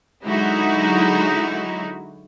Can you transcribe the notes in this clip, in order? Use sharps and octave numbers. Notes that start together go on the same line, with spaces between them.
D3 F#3 G#3 D#4 E4 F#4